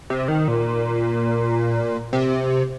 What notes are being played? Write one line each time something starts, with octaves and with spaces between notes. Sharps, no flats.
C3
D#3
A#2
C3